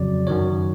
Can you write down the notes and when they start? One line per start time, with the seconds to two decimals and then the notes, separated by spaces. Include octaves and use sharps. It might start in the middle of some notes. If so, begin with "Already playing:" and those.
Already playing: F2 C#3 F#3 D5
0.27 F#2 D#3 F#3 C#5